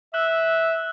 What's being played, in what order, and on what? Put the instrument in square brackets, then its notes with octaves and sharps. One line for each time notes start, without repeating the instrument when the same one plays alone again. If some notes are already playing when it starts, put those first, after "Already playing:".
[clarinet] E5 [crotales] E6 F#6